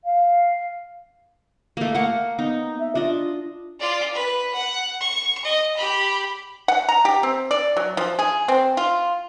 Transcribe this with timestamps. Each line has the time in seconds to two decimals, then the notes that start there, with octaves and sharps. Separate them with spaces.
0.05 F5
1.77 A3 A#3
1.95 A#3 F#5
2.39 B3 D#4
2.79 E5
2.95 D4 F4 D#5
3.80 F4 D5
4.13 B4
4.54 F#5
5.01 C#6
5.44 D#5
5.76 G4 B5
6.68 F#5
6.89 A#5
7.05 G4
7.23 C4
7.51 D5
7.77 F#3
7.97 F3
8.19 G#4
8.48 C4
8.77 F4